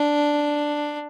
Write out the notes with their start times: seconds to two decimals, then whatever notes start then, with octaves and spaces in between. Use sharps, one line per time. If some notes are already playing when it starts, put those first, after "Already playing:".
Already playing: D4